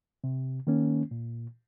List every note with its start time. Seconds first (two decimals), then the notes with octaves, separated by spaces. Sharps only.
0.24 C3
0.67 D#3 A#3 C#4
1.11 A#2